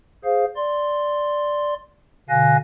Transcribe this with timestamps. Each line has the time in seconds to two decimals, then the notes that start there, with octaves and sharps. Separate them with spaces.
0.25 G#4 C5 F5
0.56 D5 C6
2.29 B2 D3 F5 G#5 F#6 A#6